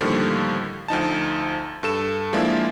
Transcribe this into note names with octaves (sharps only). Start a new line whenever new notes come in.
A2 D3 D#3 F3 G3 A#3
D2 F3 D#4 A5
G2 A4 E7
F3 G#3 A#3 D4 E4 F4